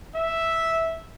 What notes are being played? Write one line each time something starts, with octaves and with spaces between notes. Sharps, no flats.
E5